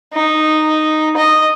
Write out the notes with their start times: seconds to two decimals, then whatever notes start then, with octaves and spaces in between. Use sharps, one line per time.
0.14 D#4
1.17 D#5